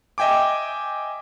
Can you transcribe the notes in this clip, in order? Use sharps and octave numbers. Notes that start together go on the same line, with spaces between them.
D#5 E5 G5 G#5 D6